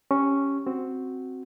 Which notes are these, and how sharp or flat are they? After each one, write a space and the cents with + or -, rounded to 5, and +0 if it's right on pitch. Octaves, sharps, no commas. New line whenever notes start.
C#4 +0 G4 +0 C#6 +0
C4 +0 F#4 +0